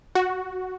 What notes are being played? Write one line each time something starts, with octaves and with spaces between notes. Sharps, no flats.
F#4